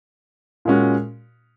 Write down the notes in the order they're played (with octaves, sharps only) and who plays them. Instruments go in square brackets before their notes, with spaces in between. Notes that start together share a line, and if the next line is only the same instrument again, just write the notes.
[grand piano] A#2 G#3 C#4 F#4